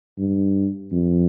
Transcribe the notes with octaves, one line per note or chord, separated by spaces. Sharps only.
G2
F2